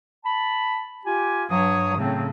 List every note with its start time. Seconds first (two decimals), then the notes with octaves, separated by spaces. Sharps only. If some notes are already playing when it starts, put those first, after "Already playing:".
0.25 A5 B5
1.05 F4 G4 G#5
1.49 G2 F#3 C#5 D#6
1.98 A2 C#3 F#3 C4